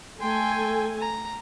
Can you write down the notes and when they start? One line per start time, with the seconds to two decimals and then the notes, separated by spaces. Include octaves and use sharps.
0.21 A3 A4 G5 G#5 C6
1.00 A#5